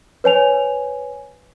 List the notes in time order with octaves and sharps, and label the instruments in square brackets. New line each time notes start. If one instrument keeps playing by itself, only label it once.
[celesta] B4 C#5 G#5 F7